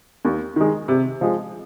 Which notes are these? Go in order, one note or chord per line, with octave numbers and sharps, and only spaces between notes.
D#2
D#3 G#3
C3
F3 G#3